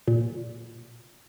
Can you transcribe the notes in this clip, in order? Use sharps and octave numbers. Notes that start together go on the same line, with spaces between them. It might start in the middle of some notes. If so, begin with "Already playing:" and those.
A#2